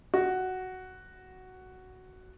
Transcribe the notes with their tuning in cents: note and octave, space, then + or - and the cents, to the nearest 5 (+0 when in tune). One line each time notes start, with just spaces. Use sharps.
F#4 +5